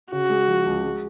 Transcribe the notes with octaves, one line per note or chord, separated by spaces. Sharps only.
C#3 F#4
G#3
F3
C#2
G#3